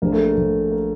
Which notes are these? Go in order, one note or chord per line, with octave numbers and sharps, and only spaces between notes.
A#1 A#3
A3
A#3
A#1
A#3